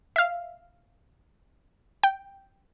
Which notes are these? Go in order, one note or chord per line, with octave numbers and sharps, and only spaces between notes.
E5 F5
G5